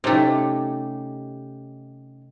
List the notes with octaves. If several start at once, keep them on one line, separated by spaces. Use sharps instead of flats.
C3 A3 C#4 D#4 G4